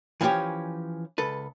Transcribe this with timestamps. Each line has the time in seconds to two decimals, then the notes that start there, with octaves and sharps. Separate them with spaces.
0.21 E3 F3 C#4 D#4 G4 C#5
1.18 C#2 A4 B4